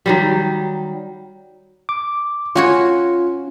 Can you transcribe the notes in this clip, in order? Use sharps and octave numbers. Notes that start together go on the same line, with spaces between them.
D#3 F#3 G3
D6
C#4 F4 F#4 C#5